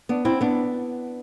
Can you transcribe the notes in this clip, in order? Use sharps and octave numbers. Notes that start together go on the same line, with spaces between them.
B3 D4
C4 E4
B3 D4